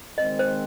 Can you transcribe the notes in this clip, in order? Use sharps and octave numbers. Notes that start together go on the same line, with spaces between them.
D#3 G#3 C4 D#5
C5